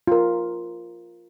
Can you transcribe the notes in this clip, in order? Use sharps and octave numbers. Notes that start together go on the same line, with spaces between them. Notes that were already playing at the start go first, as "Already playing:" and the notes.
F4 A#4